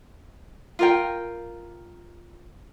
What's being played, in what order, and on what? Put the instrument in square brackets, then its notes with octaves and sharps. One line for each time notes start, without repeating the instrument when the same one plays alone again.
[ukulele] F4 A#4 G5